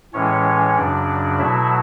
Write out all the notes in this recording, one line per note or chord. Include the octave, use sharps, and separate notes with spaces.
A2 E3 G#3 C#4 C#5
F#2 C#3 F#3 D4 D5
B2 F#3 A3 E4 E5